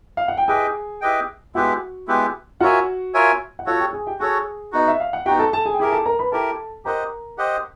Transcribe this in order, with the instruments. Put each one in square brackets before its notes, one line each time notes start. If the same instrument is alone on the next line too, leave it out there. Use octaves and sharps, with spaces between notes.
[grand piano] F5
F#5
G5
[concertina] E4 G4 B4 D#5 G5 [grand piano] G#4 G#5
[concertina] E4 G4 B4 D#5 G5
[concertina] G#3 B3 E4 G4 B4 [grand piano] F#4 F#5
[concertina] G#3 B3 E4 G4 B4
[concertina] F4 A#4 C#5 E5 G#5 [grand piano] F#4 F#5
[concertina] F4 A#4 C#5 E5 G#5
[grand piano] F#5
[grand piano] F4 F5 [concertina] F#4 A4 C#5
[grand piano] G4 G5
G#4 G#5
G4 G5
[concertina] F#4 A4 C#5 [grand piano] G#4 G#5
[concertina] B3 D#4 F#4 [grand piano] D#5
[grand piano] E5
F5
F#5
[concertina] B3 D#4 F#4 [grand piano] G4 G5
[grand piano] A4 A5
A4 A5
G#4 G#5
G5
[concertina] E4 G4 A#4 [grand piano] G#4 G#5
[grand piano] A4 A5
A#4 A#5
B4 B5
[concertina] E4 G4 A#4 [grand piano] A4 A5
[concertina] G4 C5 D#5 F#5 [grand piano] A#4 A#5
[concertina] G4 C5 D#5 F#5